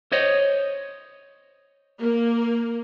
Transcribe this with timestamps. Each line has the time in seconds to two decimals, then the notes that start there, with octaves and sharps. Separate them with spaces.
0.12 C5 C#5 D#5
2.02 A#3